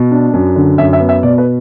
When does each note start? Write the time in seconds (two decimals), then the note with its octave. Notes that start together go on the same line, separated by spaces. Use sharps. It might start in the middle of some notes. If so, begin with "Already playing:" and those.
Already playing: B2
0.11 D4
0.33 F#2
0.56 D3
0.78 F#2 E5
0.93 E5
1.00 B3
1.09 E5
1.23 B2 D5
1.38 B4